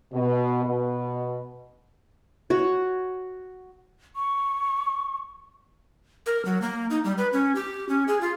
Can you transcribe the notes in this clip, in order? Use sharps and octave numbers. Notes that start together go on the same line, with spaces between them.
B2
B2
F#4 C#5
C#6
A#4
F#3
A#3
D#4
G3
B4
C#4
G4
C#4
G#4
F4